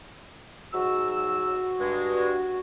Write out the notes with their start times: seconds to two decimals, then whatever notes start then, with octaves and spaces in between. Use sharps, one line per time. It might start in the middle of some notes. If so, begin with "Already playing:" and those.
0.73 G#2 F#3 F#4 E6
1.79 G2 G#3